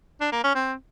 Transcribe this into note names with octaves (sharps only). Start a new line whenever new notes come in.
D4
A#3
C#4
C4